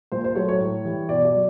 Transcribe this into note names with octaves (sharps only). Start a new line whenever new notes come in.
A#2 C5
C5
F#3 A3 C#5
C#5
A2
E3 G3
B2 D5
D5
F#3